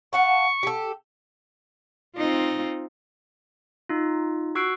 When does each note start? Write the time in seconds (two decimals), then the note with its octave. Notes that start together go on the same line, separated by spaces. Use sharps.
0.13 F5 F#5 A5 C#6
0.63 G4 A4
2.16 C4 D#4 F4
3.89 D#4 F4
4.55 F#4 C#6 E6 F#6 C7 D7